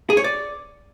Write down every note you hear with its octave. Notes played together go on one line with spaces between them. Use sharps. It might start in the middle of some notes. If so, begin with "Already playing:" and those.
G#4
C#5
D5